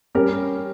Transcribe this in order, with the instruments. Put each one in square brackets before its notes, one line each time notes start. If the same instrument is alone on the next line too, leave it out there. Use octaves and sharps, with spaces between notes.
[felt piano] G3 C#4 G4 A#4